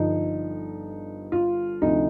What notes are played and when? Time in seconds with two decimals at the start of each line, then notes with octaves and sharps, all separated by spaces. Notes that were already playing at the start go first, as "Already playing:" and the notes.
Already playing: G1 G2 D3 F3 D#4
1.32 F4
1.82 D2 C3 F3 D#4